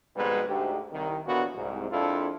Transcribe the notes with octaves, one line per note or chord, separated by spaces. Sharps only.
F2 G#2 B2 G3 G#3 B4
D2 G#2 G4
C2 D#3
D#2 A#2 D3 E3 B3 F#4
C2 G#2
A#1 F2 D4 E4 F4 A4